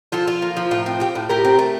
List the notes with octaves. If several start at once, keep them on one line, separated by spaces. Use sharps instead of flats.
F3 F4 A4
F4
A#3
F3
A2 F4
C4
F3 G4
A2
A2 G4 A#4
C4
A3